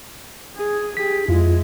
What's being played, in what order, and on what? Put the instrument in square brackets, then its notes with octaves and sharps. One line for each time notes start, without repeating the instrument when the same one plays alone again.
[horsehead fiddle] G#4
[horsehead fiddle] G4 G#4 [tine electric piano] B6
[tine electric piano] F2 F4 [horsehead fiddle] G#3 E4